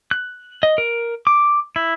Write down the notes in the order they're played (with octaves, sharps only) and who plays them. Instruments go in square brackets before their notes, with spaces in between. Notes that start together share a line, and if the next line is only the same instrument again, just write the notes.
[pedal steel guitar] F#6
D#5
A#4
D6
E4